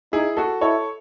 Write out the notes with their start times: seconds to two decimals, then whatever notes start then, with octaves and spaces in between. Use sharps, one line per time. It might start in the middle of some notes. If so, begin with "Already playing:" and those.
0.13 D#4 E4 G#4
0.37 F#4 A4
0.61 E4 A4 C#5